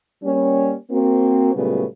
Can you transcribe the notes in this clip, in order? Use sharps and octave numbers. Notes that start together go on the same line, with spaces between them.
G3 A#3 C#4
A#3 C4 F#4
A#2 C#3 F#3 G3 A3 B3